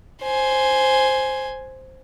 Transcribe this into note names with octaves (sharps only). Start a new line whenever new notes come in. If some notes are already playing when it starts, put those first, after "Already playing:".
C5 G#5